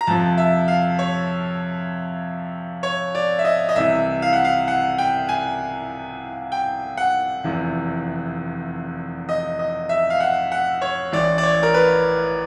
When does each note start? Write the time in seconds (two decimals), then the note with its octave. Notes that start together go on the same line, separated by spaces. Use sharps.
0.01 A#5
0.07 F2 C3 F3 A5
0.38 E5
0.68 F5
0.99 C#5
2.83 C#5
3.15 D5
3.39 E5
3.44 D#5
3.69 D#5
3.76 C2 C3 E3 E5
4.22 F5
4.33 F#5
4.44 F5
4.68 F#5
4.98 G5
5.29 G#5
6.52 G5
6.97 F#5
7.44 F1 E2 C3 E3
9.29 D#5
9.59 D#5
9.89 E5
10.10 F5
10.20 F#5
10.52 F#5
10.81 C#5
11.12 A1 A2 E3 D5
11.38 D5
11.43 C#5
11.63 A#4
11.74 B4